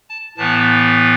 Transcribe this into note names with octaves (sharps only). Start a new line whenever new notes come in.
A5
A2 E3 B3 A5